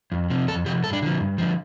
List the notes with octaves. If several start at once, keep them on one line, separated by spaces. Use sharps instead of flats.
F2
C3 F3
F2 A4
C3 F3 G4
G2 A4
D4
D3 F3
G2
D3 F3